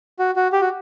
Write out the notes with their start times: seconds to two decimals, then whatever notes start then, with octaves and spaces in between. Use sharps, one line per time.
0.19 F#4
0.36 F#4
0.53 G4
0.61 F#4